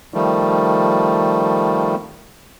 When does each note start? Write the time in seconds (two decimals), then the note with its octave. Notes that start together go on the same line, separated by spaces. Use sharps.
0.14 D#3 F3 G3 A3